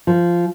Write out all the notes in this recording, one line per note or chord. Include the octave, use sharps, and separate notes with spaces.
F3